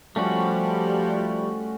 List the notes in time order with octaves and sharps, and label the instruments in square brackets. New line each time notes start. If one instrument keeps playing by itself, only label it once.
[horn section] F3 G3 [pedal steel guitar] A3 C#4 F#4